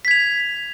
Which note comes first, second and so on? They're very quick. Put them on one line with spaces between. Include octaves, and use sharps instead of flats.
B6 G#6 F7